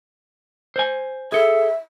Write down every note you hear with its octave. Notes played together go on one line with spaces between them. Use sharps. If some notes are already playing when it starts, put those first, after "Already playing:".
C5 G#5
G#4 A4 E5